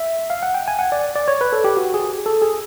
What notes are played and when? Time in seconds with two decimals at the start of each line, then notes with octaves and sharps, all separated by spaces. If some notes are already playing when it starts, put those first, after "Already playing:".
Already playing: E5
0.30 F5
0.43 F#5
0.54 G5
0.68 G#5
0.79 F#5
0.92 D5
1.15 D5
1.28 C#5
1.41 B4
1.53 A4
1.64 G4
1.77 F#4
1.94 G#4
2.26 A4
2.42 G#4